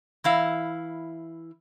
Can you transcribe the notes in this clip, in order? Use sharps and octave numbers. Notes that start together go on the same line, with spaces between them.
E3 E4 F5